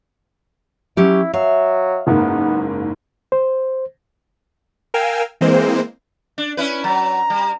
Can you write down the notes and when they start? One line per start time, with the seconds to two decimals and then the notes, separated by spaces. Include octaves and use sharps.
0.97 F#3 C#4 E4 G4
1.34 F#3 E5 F5
2.07 F#1 G#2 A#3 B3
3.32 C5
4.94 A#4 F5 G5 G#5 E6 F6
5.41 E3 G#3 A#3 C4 C5
6.38 D4
6.57 C#4 E4 B4
6.84 F#3 A#5
7.30 G3